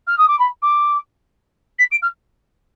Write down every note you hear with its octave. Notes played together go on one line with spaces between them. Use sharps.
F6
D#6
D6
B5
D6
B6
D7
F6